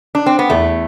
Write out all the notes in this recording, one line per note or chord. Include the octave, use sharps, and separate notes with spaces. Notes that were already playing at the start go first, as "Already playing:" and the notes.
D4
C4
B3
E2 A3